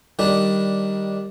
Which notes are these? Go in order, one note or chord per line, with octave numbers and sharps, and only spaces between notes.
D#3 G3 D4